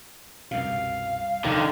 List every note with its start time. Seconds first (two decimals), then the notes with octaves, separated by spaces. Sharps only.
0.51 C2 F#2 B2 F5
1.45 C2 G#2 D3 D#3 F3